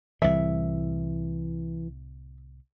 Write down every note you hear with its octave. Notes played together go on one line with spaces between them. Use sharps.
C2 A2 E3 E5